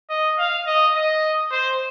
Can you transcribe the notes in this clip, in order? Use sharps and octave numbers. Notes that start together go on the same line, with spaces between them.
D#5
F5
D#5
D#5
C5